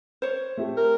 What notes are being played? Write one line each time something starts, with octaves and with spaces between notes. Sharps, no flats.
C5 C#5
A3 C4 G4
A#4